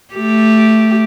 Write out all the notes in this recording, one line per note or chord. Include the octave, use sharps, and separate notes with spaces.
A3 G4